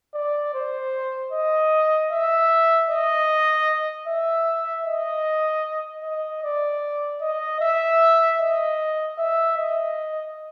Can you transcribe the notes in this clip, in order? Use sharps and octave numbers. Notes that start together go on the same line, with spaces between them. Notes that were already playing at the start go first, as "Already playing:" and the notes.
D5
C5
D#5
E5
D#5
E5
D#5
D#5
D5
D#5
E5
D#5
E5
D#5